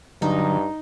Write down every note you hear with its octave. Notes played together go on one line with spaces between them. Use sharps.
G2 D3 F#3 D#4